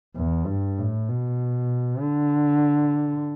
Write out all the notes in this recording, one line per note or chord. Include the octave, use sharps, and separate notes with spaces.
E2
G2
A2
B2
D3